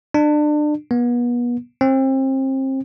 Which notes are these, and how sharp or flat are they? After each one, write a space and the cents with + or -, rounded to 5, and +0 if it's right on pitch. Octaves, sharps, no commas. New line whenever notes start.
D4 +30
B3 -35
C4 +30